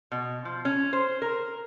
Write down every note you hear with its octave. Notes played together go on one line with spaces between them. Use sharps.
B2
F3
C#4
C5
A#4